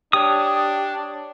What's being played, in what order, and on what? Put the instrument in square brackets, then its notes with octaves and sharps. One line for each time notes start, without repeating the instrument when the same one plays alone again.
[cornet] D4 [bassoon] G4 [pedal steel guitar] C#5 D#6